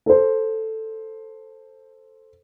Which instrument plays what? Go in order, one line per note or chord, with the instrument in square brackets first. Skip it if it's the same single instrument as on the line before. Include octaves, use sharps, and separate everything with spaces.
[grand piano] A4 C5